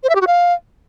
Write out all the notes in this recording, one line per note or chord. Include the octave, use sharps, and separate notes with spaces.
C5
E5
G4
F#4
F5